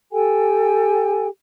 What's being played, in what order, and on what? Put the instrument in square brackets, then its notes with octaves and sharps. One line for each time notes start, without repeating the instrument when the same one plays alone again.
[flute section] G4 A4 G5 G#5